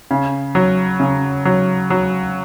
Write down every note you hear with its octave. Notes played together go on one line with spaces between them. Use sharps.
C#3
F#3
C#3
F#3
F#3